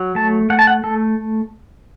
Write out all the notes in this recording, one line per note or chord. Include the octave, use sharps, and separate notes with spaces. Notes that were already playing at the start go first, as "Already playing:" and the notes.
Already playing: F#3
A3 A5
A3 F#5
A5
F#5
A3 A4